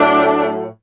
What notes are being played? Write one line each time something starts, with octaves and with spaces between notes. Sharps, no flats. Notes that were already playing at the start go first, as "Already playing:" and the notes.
Already playing: A2 F#3 A3 D4